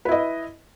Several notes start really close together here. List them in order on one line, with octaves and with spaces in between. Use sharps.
B4 E4 D#5